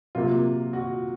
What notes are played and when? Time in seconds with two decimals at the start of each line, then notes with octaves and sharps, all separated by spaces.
0.15 C3 F#3 A#3 F4
0.73 F#4